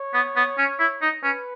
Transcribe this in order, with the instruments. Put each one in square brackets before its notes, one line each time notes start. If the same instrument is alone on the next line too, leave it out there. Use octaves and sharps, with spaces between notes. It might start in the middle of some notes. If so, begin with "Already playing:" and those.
Already playing: [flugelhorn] C#5
[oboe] B3
B3
C#4
E4
D#4
[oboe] C#4 [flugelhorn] B4